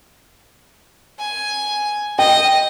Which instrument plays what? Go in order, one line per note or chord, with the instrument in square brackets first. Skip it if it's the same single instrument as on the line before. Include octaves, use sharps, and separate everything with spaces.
[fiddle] G#5
[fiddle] D#5 [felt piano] G5